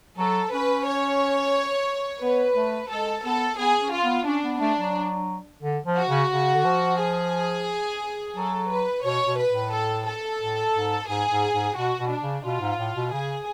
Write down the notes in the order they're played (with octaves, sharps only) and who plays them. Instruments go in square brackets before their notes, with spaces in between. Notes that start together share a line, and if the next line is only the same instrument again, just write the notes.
[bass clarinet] F#3 [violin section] A4
[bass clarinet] C#4 [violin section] B4
[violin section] C#5
[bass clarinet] B3 [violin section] B4
[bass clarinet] A3
[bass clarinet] G#3 [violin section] A4
[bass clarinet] B3 [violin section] A4
[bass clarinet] B3 [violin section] G#4
[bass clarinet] C#4
[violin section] F4
[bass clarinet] B3
[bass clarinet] C#4 [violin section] D4
[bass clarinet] B3
[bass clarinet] A3 [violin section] D4
[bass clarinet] F#3
D3
F3
[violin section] F#4
[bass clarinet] C#3
C#3
D3
F3
[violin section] G#4
[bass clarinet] F#3 [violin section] A4
[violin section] B4
[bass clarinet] B2 [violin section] C#5
[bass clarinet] B2
[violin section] B4
[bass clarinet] A2
[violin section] A4
A4
[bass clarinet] A2
G#2
[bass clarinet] G#2 [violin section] G#4
[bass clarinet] G#2
G#2
[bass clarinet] B2 [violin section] F#4
[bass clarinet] B2
[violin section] D4
[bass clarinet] C#3
[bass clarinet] B2 [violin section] F4
[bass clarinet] G#2
A2
B2
[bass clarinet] C#3 [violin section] G#4